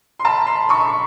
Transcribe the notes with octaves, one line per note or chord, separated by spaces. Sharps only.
C6
A5 B5
A#5 C6
B5 C#6